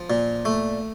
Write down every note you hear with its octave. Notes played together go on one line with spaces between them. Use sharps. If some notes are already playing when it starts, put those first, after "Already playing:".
Already playing: F3
A#2
A3